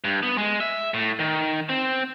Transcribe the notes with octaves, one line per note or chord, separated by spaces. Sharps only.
G2
B3
G#3
E5
A2
D#3
C4